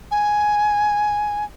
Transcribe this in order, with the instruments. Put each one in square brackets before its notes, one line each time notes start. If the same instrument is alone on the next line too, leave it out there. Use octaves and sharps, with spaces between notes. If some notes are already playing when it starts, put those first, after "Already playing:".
[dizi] G#5